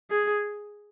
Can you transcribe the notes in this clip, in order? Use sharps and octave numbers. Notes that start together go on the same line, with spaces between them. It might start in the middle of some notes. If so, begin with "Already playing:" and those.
G#4